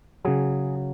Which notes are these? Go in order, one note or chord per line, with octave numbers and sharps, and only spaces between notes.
C#3 F#3 G#4